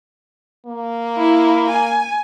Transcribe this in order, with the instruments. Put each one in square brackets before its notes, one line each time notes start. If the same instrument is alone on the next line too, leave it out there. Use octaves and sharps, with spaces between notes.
[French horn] A#3
[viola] E4
G#5